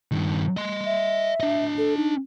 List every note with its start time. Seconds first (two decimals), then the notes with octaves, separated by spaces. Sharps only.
0.12 G2 D#3
0.57 D#5 C6
0.86 E5
1.40 D4 D#5
1.78 A4
1.97 D#4